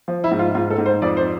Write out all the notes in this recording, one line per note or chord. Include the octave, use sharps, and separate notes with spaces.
F3
E4
G#2
F4
G#2 F4
A4
G#2
C5
F2 D5
C5